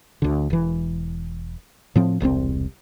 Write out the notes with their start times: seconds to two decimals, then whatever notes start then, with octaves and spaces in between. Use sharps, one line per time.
0.22 D2 D3
0.50 E1 E3
1.95 A2 F3 C4
2.20 E1 C2 A#3 C4